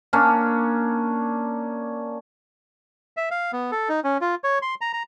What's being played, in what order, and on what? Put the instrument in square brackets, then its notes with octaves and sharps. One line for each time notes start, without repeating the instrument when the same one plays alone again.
[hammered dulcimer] A#3 C#4 D4
[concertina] E5
F5
B3
A4
D#4
C#4
F4
C#5
C6
A#5
A#5